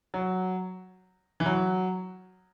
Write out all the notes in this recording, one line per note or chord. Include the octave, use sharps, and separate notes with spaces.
F#3
E3
F#3